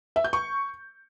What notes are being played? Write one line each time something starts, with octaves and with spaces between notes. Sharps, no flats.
E5
G6
C#6